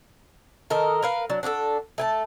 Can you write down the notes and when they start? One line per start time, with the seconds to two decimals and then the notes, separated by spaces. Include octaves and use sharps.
0.70 D#3 A4 A#4 D#5
1.02 A#4 B4 F5
1.30 F#3 D4
1.43 D4 F#4 G#4 A4
1.98 A3 G#5 A5